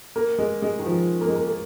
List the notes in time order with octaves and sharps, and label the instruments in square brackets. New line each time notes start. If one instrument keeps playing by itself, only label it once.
[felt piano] A#3
G#3
G#3
D#3
F3
A#3
G#3
A#3
A#3